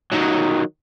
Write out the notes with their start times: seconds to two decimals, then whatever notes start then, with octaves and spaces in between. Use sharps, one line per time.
0.12 D#3 F#3